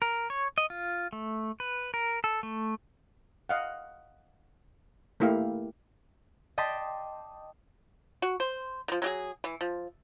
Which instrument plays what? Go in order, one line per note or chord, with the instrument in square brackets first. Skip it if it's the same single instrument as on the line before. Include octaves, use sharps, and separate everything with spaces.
[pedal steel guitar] A#4
C#5
D#5
F4
A3
B4
A#4
A4
A3
[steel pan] D#5 F5 F#5
A3 A#3 E4 G4 F5
[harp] D#5 G5 A5 C6 D6 B6
[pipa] F#4
C5
D#3 F3
F#3 G4 G#4
E3
F3